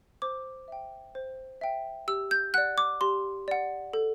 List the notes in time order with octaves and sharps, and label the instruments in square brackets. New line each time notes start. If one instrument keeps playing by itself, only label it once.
[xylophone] C5 D6
E5 G5
C5
E5 G5
G4 E6
G6
D5 F#5 F#6
D6
G4 C6
D5 F#5
A4